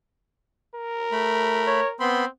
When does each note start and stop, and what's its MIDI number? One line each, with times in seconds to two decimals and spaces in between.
0.75 2.01 70
1.12 1.81 57
1.12 1.81 83
1.67 1.88 73
2.00 2.25 59
2.00 2.26 60
2.00 2.25 83
2.00 2.25 84